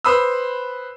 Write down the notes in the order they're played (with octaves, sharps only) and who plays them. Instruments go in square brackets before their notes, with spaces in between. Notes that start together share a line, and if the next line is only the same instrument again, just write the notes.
[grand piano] B4 C5 B5 C6 D#6 E6